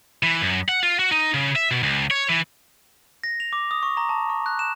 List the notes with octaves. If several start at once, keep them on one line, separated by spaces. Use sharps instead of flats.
E3
F#2
F#5
F4
F#4
D#4
C#3
E5
B2
C#2
C#5
E3
A#6
F7
D6
D#6
C#6
A#5
A5
C#6
F#6
E7